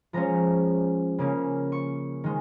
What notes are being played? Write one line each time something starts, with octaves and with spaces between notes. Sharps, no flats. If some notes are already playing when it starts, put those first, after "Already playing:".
F3 G#3 C#4 A#5
C#3 A#3 C#4
C#6
D#3 G#3